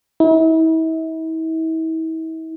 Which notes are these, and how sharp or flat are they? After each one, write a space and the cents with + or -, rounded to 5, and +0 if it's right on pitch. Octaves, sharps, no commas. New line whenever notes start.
E4 -40